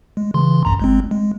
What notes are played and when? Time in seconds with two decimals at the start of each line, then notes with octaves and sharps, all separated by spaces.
0.17 G#3
0.34 C#3 E3 C6
0.65 A#1 F#2 A#5
0.80 G1 G#3 C4
1.11 G#3